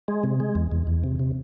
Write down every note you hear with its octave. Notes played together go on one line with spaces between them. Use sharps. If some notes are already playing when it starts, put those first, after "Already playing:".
G#3
C3
G#3
E2
E2
E2
C3
C3